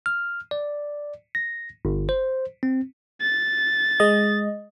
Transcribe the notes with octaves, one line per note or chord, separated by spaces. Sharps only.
F6
D5
A#6
G1
C5
C4
A6
G#3 D#5